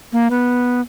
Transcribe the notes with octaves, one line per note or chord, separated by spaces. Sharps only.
A#3
B3